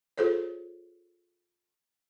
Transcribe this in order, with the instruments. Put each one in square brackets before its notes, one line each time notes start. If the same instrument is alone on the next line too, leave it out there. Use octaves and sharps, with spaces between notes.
[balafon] F4 G#4 A4 C5 C#5